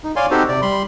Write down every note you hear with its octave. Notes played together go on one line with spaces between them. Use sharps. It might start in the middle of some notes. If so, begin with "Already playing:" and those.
D#4
C#5 D5 F5 G#5 C6
C4 D#4 F#4 G4 A4 C5
C3 D5
G3 B5 C6